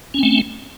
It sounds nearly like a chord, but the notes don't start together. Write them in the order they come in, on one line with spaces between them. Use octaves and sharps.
C#4 C4 A3